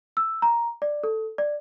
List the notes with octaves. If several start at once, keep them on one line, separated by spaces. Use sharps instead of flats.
E6
A#5
D5
A4
D5